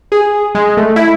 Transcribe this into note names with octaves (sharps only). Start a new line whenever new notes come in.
G#4
G#3
A3
E4